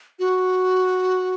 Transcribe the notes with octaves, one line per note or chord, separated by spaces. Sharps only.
F#4